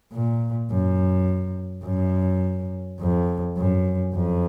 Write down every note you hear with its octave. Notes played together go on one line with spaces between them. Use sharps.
A#2
F#2
F#2
F2
F#2
F2